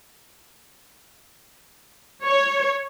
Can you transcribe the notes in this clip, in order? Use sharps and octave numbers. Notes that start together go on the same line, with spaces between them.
C#5